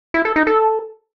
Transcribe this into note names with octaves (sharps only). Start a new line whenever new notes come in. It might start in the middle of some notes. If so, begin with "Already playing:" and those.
E4
A4
D#4
A4